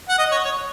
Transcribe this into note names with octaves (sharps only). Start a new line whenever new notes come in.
F#5
D#5
C#5
C#5